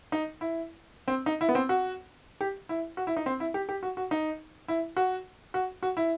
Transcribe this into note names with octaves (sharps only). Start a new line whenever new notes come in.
D#4
E4
C4
D#4
E4
B3
C4
F#4
G4
E4
F#4
E4
D#4
C4
E4
G4
G4
F#4
F#4
D#4
E4
F#4
F#4
F#4
E4